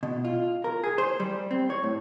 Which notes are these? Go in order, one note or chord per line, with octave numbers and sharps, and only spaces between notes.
B2
F4
A#4
G#4
C5
G3
C4
C#5
A2